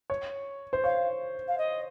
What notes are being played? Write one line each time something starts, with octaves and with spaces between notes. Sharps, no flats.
C#5
C5
C#5 F5
F5
D#5